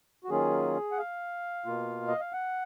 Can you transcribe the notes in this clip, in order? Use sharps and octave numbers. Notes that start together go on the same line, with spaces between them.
F#4
D#3 F#3 A#3 C#4 F4 G#4
F#5
F5
B2 A#3 F4
D#5
F5
F#5